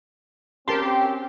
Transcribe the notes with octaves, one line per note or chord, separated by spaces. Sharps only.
C4 C#4 G4 A#4 A5 C6